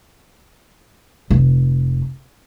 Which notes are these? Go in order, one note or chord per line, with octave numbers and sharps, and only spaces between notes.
F1